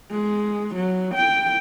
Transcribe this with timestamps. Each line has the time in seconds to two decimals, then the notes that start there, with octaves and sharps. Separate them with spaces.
0.11 G#3
0.75 F#3
1.14 G5